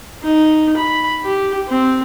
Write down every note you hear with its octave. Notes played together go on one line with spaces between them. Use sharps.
D#4
B5
G4
C4